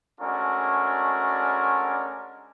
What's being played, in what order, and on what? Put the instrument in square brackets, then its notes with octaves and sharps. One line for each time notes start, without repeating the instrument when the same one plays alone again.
[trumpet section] G#3 A3 C#4 D4 F#4 A#4